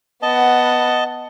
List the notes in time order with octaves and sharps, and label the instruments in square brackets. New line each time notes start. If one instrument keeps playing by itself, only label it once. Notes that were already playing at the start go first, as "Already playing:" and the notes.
[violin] B3 F#5 [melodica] D#5 A5